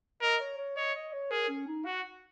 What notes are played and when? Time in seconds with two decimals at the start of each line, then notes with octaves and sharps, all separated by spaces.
0.21 A#4 D#5
0.40 C#5
0.58 C#5
0.77 C#5 D#5
0.95 D#5
1.13 C#5
1.31 G#4 A#4
1.49 C#4
1.68 D#4
1.85 F#4 F#5